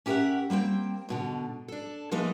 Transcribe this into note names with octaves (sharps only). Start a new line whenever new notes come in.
C#4 G4 A#4 B4 E5 F#5
G3 A#3 C4 G5
G#2 B2 D3
D4 A4
F3 G#3 A#3 B3 D#4 E4